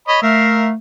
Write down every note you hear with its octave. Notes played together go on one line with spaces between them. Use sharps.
C#5 D#5 B5
A3 A#4 E5 F5